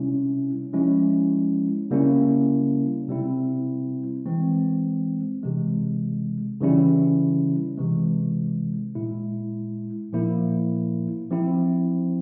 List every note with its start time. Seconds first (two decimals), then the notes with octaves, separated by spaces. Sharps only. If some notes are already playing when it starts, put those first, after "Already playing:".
Already playing: C3 G3 C#4 E4
0.73 F3 G#3 C#4 E4
1.90 C#3 G3 A#3 C#4 E4
3.08 C3 G3 C4 E4
4.26 E3 G#3 C4
5.43 C3 E3 G#3
6.61 C#3 E3 G3 C#4 E4
7.78 C3 E3 G#3
8.95 A#2 G#3 E4
10.13 A#2 F3 A#3 E4
11.31 F3 C4 E4